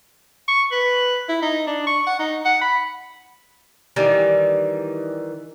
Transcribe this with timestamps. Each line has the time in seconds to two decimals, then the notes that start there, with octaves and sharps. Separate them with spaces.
0.48 C#6
0.72 B4
1.29 E4
1.42 D#4
1.67 D4
1.87 C#6
2.07 F#5
2.19 D#4
2.45 F#5
2.61 B5
3.96 D#3 E3 G3